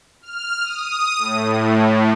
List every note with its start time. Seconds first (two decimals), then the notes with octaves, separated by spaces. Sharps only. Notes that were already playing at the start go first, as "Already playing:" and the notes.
0.22 F6
0.64 D#6
1.18 A2